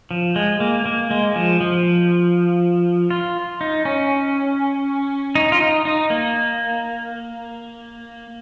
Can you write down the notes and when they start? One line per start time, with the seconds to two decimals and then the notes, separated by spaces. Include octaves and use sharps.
0.11 F3
0.36 G#3
0.60 A#3
0.86 A#3
1.11 G#3
1.36 F3
1.61 F3
3.10 F4
3.61 D#4
3.85 C#4
5.35 D#4
5.52 F4
5.60 D#4
5.85 D#4
6.10 A#3